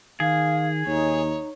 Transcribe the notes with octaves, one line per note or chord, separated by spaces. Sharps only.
D#3 G#4 F5
D#2 D#4 C#5